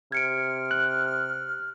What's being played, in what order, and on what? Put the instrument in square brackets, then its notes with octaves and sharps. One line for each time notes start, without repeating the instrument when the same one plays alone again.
[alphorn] C3 [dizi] F6 [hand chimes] G#6 C#7 D7
[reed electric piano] F#6